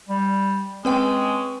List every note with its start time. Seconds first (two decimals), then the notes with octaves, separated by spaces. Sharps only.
0.09 G3
0.85 G#3 C4 C#4 B4 G5